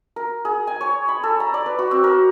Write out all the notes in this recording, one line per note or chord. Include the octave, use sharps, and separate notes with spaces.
A#4
G#4
G#5
C#5
B5
A4
A#5
D5
B4
F#4
C4
A#4